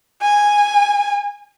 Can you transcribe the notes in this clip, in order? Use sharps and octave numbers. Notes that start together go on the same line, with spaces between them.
G#5